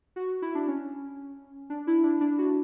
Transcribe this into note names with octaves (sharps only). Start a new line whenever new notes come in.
F#4
E4
D4
C#4
D4
E4
D4
D4
F#4